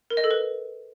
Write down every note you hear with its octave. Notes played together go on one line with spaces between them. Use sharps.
A#4
D#5
A4
B4